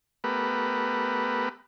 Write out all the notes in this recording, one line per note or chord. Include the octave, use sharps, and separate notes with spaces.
A3 B3 G4 A#4 B4